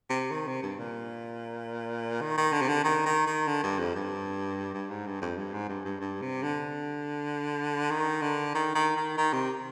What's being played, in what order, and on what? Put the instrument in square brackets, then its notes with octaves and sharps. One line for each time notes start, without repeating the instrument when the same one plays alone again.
[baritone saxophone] C3
D#3
C3
G2
A#2
D#3
D#3
D3
C3
D3
D#3
D#3
D#3
D3
G2
F2
G2
G2
G#2
G2
F2
G2
G#2
G2
G2
G2
C3
D3
D#3
D3
D#3
D#3
D#3
D#3
C3